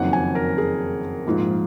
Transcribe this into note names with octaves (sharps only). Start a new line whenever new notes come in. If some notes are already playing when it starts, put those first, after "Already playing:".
Already playing: F#1 F2 D#3 F#3 F#5
G#5
A#4
G#4
A#1 G#2 F3